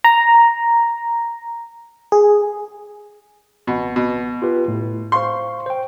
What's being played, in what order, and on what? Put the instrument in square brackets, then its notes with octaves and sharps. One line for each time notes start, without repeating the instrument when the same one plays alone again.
[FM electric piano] A#5
G#4
[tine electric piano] A1 F#5 [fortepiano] B2
[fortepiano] B2
[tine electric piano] F4 G4 B4
A2
[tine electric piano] C5 F5 C#6 [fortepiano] C6
[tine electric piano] C5 G5